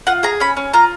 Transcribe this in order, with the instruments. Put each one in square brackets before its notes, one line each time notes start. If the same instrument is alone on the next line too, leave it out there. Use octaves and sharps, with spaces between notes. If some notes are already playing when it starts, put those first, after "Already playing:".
[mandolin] F4 F#5
G#4 A#5
C#4 B5
C#4
F4 A#5